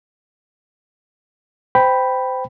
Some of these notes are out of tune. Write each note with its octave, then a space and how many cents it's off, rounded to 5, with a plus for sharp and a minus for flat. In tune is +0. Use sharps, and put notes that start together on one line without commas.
C5 -25 G5 +0 B5 +0